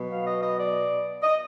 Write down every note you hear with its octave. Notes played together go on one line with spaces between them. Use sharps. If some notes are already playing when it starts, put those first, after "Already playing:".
Already playing: B2 F#3 B3
F5
D#5
D#5
D5
D#5